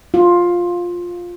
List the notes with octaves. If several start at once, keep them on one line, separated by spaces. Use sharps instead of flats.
F4